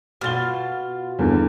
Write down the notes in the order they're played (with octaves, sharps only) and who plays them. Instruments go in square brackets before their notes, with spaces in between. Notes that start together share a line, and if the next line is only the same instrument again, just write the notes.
[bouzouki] B2 F4 [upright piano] F6 A6 G7
[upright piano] E2 G2 D3